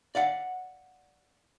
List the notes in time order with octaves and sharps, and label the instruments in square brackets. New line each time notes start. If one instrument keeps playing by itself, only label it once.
[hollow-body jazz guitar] D5 F5 F#5